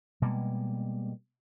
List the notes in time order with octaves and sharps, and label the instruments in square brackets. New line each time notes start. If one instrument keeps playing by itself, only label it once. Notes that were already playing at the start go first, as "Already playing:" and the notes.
[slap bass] B2 G3 G#3 A#3